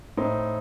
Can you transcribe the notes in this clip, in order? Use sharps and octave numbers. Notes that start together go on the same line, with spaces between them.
A2 C4 D#4